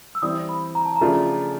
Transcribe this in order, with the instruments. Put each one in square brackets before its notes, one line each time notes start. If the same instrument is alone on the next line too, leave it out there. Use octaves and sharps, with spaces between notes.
[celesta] E6
[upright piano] E3 G3 C4 [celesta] D#6
[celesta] B5
A#5
A5
A#5
[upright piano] C#3 F3 A3 D4 F4